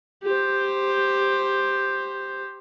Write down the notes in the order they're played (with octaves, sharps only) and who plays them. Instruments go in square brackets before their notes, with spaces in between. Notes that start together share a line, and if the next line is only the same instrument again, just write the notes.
[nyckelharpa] G4 C5